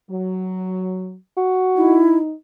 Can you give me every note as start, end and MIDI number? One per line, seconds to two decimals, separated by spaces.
0.11 1.16 54
1.37 2.01 66
1.76 2.33 63
1.76 2.16 64